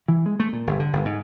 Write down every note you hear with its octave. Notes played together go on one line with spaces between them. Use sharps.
E3
G#3
A3
A#2
G1
D3
G1
G#2